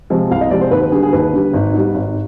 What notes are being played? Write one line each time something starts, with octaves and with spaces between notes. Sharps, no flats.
C3 F3 G#3
C2 F5
D#5
C3 F3 G#3 D5
C5
D#2 B4
B4
D3 G3 G#4
G#4
D#2 B4
D3 G3
G#1
G#2 G3
G#1